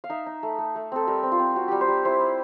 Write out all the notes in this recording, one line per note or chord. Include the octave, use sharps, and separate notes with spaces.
F5
D#4 E5
D#4
A3
A3
A3
C4 A4
G3 A#4
C4
F4
C4
C4 F#4
G3 G4
C5
G3
E4 C5
E4